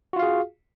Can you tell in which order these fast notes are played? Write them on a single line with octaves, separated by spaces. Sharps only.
F#4 F4 F5 G#4